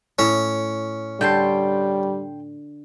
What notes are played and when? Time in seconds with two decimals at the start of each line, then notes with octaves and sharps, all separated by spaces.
0.19 A2 C#4
1.21 D3 G3 G5 A5 C6